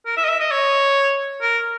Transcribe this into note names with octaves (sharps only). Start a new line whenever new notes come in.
A#4
E5
D#5
E5
D#5
C#5
A#4